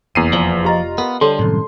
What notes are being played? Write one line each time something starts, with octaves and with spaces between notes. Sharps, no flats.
F1 E2 A#3 C7 D#7
F3 D5
F4 G4 D#5 A#5
B3 A#4
D3 G3 A4 C#5 A5 C6
C2 F#2 A2 D#3